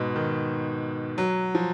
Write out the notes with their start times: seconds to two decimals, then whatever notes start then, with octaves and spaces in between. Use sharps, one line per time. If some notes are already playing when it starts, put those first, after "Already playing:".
Already playing: G#2 B2
0.16 D#3
1.18 F#3
1.55 F3